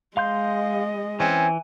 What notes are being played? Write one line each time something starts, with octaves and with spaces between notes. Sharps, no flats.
G#3 D#5 F5 C6 G6
E3 C4 C#4 G#5